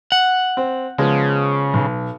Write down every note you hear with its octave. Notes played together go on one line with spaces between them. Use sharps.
F#5
C4
C#3 F3 G#3 B3
B1